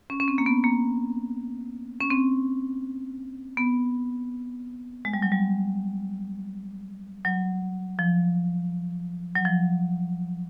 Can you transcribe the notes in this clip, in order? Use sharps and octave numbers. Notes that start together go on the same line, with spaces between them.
C#4
C#4
C4
A#3
B3
A#3
C#4
C4
B3
G#3
G3
F#3
G3
F#3
F3
F#3
F3